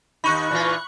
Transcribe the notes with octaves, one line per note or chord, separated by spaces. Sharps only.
D#2 D#4 B5 C#6 F#6
A#2 E3 F4